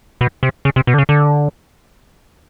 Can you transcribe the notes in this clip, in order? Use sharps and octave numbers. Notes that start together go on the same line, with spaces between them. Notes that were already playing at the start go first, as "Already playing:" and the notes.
B2
C3
C#3
C3
B2
D3
C#3
D3